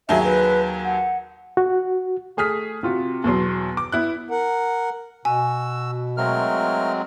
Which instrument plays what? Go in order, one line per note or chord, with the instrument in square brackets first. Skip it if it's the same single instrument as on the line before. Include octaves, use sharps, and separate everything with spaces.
[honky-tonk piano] D#2 F#3 G#4 [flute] E5
[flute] B4
F#5
[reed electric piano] F#4
[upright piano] A3 G#4 D#6 F6 B6
C3 F4 F#4
E2 B2 F#3 C6
D6
B3 E4 F#6
[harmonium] A#4 F#5
[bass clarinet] B2 [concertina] F#4 E6 [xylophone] G#5
[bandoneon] F#3 G#3 C4 [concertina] A3 A#4 F6